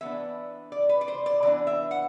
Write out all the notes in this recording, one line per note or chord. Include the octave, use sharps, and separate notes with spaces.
E3 B3 D4 E5
D5
B4
D5
C5
D5
E3 B3 D4 D5
E5
F#5